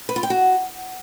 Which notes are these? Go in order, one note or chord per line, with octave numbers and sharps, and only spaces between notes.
B4
F4
G5
F#4